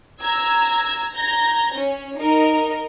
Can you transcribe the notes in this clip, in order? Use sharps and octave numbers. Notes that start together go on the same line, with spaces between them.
A#5 E6 G#6
A#5 G6 G#6 A#6
C#4
D#4 A#4 D#5